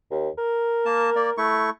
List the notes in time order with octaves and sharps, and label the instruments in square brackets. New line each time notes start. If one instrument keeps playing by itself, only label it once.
[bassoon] D#2
A#4
[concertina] A#3 A5
A#3 D5
A3 E4 C#6